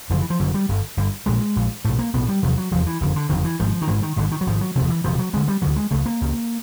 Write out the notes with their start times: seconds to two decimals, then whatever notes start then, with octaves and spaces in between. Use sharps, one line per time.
0.10 F#1 F#2 D3 F3
0.20 E3
0.30 F3
0.40 F#1 F#2 D3 F#3
0.54 G3
0.69 G1 G2 D3
0.97 G1 G2 D3
1.26 A#1 A#2 G#3
1.56 A#1 A#2
1.84 B1 A2 A3
1.99 A#3
2.13 B1 A2 B3
2.28 G3
2.43 F1 E2 C3 F#3
2.58 F#3
2.71 F1 E2 C3 F3
2.86 E3
3.01 F#1 F2 D3 D#3
3.16 D3
3.29 F#1 F2 D3 D#3
3.44 E3
3.59 G#1 G#2 F3
3.82 D#3
3.87 G#1 G#2 E3
4.02 D#3
4.17 G#1 G#2 D3
4.31 D#3
4.41 F#3
4.47 G#1 G#2 F3
4.61 F#3
4.75 E1 D2 C3 F3
4.89 E3
5.04 E1 D2 F3
5.08 C3
5.19 F#3
5.33 D2 D3 G#3
5.48 G3
5.62 D2 D3 F#3
5.76 G#3
5.91 C#2 C#3 A3
6.06 A#3
6.21 C#2 C#3